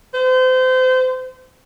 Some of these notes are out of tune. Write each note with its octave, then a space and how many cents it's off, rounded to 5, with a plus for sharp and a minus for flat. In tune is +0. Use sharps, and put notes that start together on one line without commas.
C5 -30